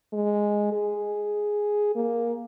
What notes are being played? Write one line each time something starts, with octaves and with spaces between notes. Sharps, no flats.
G#3
G#4
A#3